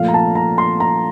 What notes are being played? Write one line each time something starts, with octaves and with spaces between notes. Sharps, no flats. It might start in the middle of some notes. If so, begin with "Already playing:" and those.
Already playing: A#2 F3 A3 F5
A#5
A5
A#5
C6
A#5